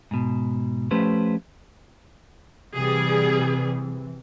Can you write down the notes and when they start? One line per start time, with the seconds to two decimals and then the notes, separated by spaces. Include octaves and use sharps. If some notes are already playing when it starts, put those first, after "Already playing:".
0.11 G#2 B2
0.91 F3 A3 C#4 G4 B4 C5
2.74 C3 E3 G3 G#4